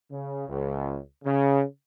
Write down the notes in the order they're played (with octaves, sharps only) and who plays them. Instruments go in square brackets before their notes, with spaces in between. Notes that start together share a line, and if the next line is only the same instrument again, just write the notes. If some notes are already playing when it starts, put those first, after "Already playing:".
[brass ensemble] C#3
C#2
C#3